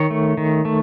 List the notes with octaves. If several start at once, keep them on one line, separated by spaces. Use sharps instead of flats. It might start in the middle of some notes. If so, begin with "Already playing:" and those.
Already playing: D#3 C#5
A3
D#3
A3